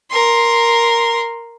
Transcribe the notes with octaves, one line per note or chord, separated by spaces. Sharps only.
A#4 C6